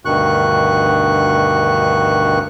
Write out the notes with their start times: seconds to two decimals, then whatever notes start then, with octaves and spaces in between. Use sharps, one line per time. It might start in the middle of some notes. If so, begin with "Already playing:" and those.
0.05 D2 G2 B2 D#3 C#6 F#6